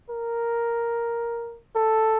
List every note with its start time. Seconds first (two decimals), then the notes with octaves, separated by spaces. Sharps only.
0.10 A#4
1.76 A4